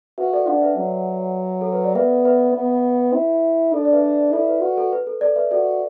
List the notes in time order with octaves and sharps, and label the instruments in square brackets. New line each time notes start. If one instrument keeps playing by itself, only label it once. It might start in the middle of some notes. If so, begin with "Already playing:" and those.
[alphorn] F#4 [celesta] B4 E5
[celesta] A4 D5
[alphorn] D4 [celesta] D5 F#5
[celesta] B4 E5
[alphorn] F#3
[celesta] A4
B4
D5
[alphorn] B3 [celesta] B4 E5
[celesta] B4 E5
[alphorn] B3
E4
[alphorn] D4 [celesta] A4 D5
[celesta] D5
B4 E5
[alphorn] E4 [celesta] A4 D5
[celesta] B4
[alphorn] F#4 [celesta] B4
[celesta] A4
B4
A4
A4 D5
B4 E5
[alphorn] F#4 [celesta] A4 D5